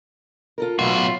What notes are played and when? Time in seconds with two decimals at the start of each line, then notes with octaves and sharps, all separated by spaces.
0.58 F4 A4 A#4
0.79 B1 A2 F#3 F4 F#4 C#5